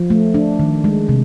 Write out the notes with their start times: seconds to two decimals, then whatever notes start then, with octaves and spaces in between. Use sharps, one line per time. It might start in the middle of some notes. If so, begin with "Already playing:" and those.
Already playing: F3
0.10 A3
0.34 D4
0.60 D#3
0.84 G#3
1.09 C3